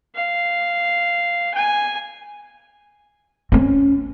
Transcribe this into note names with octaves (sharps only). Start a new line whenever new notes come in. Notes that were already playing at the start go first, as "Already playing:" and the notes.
F5
G#5
C4 C#4